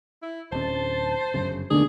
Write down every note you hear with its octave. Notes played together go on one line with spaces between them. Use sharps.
E4
D1 C#4 C5 A5
G1 F#2 C#3
D#2 B2 D3 D#3 A3 D4 G#4